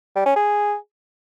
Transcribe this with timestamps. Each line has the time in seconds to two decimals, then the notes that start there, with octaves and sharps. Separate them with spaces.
0.16 G3
0.26 C#4
0.36 G#4